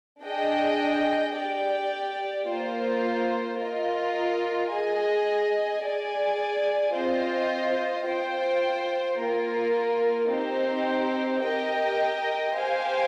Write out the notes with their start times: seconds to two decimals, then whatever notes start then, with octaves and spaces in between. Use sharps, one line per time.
0.23 D4 G#4 D#5 G5
1.35 G4 D5 G5
2.47 A#3 F4 C5
3.58 F4 A#4 D#5
4.70 G#4 D#5 G#5
5.82 G#4 D5 G#5
6.94 C4 F4 C5 D#5
8.06 F4 C5 G5
9.18 A#3 F4 A#4
10.30 C4 D#4 G4 C5
11.42 G4 A#4 D#5 G5
12.54 G4 C5 F5 G#5